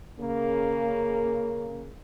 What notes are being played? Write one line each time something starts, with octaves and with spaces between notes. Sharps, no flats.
C#3 A#3